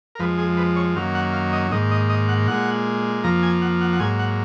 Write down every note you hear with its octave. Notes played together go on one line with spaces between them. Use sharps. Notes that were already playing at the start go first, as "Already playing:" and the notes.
A#4
F2 F3 G#3 B4
G#4
B4
C#5
F#2 D#3 F#3 A#3 F5
F#5
F5
D#5
G#2 D#3 A#3 D#5
D#5
D#5
F#5
A#2 G#3 F#5
F2 F3 A#3 A#5
G#5
F#5
F#5
F#5
G#2 F#3 A#3 G#5
F#5